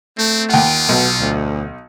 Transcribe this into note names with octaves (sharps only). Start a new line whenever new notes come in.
A3 C4
D#2 F4 F#5
B1 B2
D2